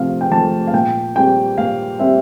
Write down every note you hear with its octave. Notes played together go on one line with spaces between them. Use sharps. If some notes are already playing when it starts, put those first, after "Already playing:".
Already playing: C3 F3 A3 F5
G5
F3 A3 A5
F5
A#2 G5
G3 C4 G5
A#2 F5
G3 C4 E5